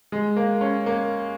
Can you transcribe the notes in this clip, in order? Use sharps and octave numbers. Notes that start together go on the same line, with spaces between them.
G#3
A#3
C#4
A#3